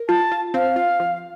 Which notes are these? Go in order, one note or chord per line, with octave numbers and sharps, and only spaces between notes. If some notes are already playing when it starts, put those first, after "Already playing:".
Already playing: A#4
F4 A5
F4
C4 F5
F4
F3